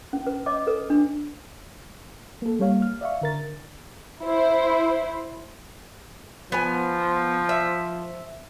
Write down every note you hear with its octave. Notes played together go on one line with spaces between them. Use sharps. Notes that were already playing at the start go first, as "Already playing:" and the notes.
C#4
B4
C#5 D#5 D6
A4 B4
D4
A#3 A4
G3 A#3 C#5 F5
F6
D5 E5 F5 C#6
D3 A#4 A6
E4 C5
F3 B3 G#5
E5